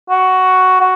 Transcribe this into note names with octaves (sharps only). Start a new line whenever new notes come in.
F#4
F#4